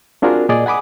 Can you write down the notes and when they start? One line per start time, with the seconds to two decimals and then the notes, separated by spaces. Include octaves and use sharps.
0.22 C4 D4 F4 F#4 G#4 A#4
0.49 A#2 G#4 D5 D#5
0.66 F#5 G#5 B5 D6 D#6